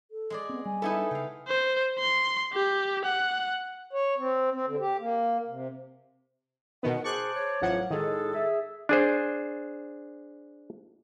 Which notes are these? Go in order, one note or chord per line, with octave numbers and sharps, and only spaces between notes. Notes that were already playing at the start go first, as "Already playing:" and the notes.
A4
G#3 G#4 D5
B3 C4
G3 G#5
B3 D#4 E4 A4
C#3 F5 G5
C5
C6
G4
F#5
C#5
C4
C4
D3
G4
A#3
C3
B2 D#3 B3 F#5
G#4 C5 A5 C#6 D6 F#6
C#5
A1 F3 F#3 F#5
A2 D#3 G#3 G#4 A4
G#4 E5
D4 G#4 C5